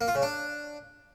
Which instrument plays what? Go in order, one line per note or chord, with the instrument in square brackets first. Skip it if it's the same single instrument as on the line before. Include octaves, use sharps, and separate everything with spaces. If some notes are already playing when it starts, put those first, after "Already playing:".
[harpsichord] A#3
F4
C#3
D4